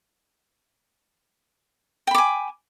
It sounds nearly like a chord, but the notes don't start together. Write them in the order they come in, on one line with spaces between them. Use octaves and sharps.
G5 B5 D6 G#5